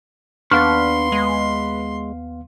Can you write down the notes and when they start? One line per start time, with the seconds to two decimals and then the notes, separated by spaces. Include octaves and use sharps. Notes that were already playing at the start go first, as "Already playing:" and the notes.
0.51 D#2 B3 D4 B4 F5 C6 C#6 F6
1.12 G#3